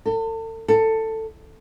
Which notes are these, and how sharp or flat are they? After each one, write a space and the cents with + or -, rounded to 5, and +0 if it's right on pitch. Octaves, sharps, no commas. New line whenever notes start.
A4 +35
A4 +15